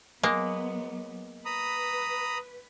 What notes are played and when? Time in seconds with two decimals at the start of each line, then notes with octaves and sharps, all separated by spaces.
0.23 F#3 G#3 A#3 B3
1.45 B4 A#5 B5 D#6